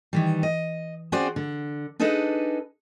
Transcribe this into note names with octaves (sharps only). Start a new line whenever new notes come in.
D#3 E3 G3
D#5
C4 C#4 F#4 G#4 C5 D5
D3
D4 D#4 G#4 A4 B4 D#5